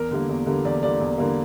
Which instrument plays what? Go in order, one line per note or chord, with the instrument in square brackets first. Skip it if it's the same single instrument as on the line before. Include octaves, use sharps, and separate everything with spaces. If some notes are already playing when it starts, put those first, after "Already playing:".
Already playing: [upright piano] E2 A#4
D3 G3 A#3
E2
D3 G3 A#3
E2 D5
D3 G3 A#3 D5
E2
D3 G3 A#3